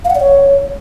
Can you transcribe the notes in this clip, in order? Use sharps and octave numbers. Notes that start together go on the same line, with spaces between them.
F5
F#5
D5
C#5